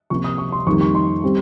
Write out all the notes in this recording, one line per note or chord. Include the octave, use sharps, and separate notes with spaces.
C3 F3 A#3 C#6
D#6
C#6
C6
F2 D#3 G3 A#3 C#6
C#6
C6
G3 C4